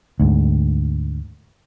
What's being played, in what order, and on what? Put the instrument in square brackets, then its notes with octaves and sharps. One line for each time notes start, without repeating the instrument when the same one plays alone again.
[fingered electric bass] D2 G#2